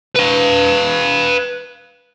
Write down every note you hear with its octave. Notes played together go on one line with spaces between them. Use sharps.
B4 F5